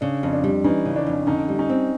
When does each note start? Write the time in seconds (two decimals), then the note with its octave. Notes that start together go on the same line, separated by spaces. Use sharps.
0.01 C#3 D4
0.23 F2
0.33 D4
0.44 G3
0.64 E3 C#4 D#4
0.85 C#3
0.96 D4
1.07 F2
1.27 D3 C#4 D#4
1.49 G3
1.59 C#4 D#4
1.69 C4